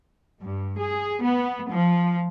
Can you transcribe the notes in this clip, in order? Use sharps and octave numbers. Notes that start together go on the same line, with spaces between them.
G2
G#4
B3
F3